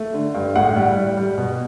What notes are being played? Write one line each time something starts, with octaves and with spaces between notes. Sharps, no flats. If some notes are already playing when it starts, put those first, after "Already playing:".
Already playing: A3
D3
G2
A2 F#5
G3
G3
G3
B2